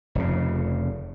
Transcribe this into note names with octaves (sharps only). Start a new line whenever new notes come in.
F1 F2 C#3